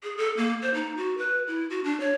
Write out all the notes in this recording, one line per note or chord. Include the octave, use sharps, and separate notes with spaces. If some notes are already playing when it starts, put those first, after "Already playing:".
G#4
A4
A#3
C5
D#4
F#4
B4
E4
F#4
D4
C#5